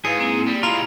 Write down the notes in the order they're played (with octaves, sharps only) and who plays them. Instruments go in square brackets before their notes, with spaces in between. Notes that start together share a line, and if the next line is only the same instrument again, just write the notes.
[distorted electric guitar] G#2 [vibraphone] E4 B4 F5 [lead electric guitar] G#4 [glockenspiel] C#7
[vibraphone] A#3 C4 E4
[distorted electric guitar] G3 [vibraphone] A#3
[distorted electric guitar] C3 G#3 [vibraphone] E4 [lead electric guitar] F4 [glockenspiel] A#5 B5 F7